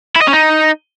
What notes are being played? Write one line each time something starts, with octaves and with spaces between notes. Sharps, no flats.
E4
D#5
C#4
D#4